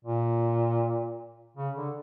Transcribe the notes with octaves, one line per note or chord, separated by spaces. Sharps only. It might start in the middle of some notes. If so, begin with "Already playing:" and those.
A#2
C#3
D3